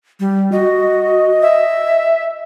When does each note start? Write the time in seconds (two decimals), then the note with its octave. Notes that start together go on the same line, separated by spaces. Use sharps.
0.20 G3
0.52 F#4 D#5
1.42 E5